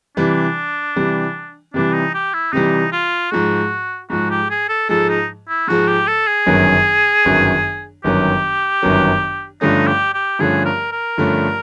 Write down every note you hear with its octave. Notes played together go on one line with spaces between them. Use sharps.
C3 E3 G3 D4
C3 E3 G3
C3 E3 G3 D4
D#4
G4
E4
C3 E3 G3 D#4
F4
G#2 F3 G#3 F#4
G#2 F3 G#3 F#4
G4
G#4
A4
G#2 F3 G#3 A4
D#4
E4
G#2 F3 G#3 F#4
G4
A4
G#4
G1 F#2 D#3 F#3
G1 F#2 D#3 F#3
G1 F#2 D#3 F#3 G4
G1 F#2 D#3 F#3
G2 D3 F3 A3 C#4 D#4
G4
G4
G2 D3 F3 A3 C#4 G#4
A#4
A#4
G2 D3 F3 A3 C#4